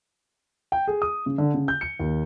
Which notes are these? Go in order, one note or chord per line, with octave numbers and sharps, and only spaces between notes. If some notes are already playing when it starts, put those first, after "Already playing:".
G5
G#4
D#6
C#3
D3
C#3
G6
C#7
D#2